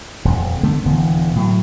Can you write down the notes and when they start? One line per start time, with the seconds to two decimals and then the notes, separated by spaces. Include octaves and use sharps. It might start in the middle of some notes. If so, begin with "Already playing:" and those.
0.25 D#1 F2
0.63 D3 A3 B3
0.85 D#1 D3 E3 B3
1.35 A2 F#3